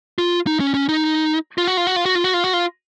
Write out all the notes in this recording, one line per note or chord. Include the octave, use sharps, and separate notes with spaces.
F4
D#4
C#4
C#4
D#4
F4
F#4
F4
F#4
F4
F#4
F4
F#4
F4
F#4
F4